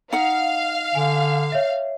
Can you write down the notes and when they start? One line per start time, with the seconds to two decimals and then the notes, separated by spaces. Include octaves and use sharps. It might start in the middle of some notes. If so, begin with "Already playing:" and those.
0.13 D#4 F5 F#5
0.95 D3 G#5
1.52 C#5 E5